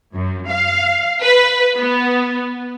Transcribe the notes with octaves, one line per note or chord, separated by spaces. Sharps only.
F#2
F5
B4
B3